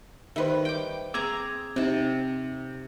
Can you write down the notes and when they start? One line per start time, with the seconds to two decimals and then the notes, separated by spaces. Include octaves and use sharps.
0.36 D#3 G3 B4 C5 E5
0.65 G5 D6
1.14 C4 G#4 A#5 D6 E6 G#6
1.76 C3 C4 D#4 A5